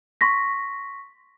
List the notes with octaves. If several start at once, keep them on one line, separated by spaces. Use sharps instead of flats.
C6 C#6 A#6 B6